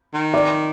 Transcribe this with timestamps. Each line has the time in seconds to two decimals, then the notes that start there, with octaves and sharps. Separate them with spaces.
0.14 D#3
0.34 D5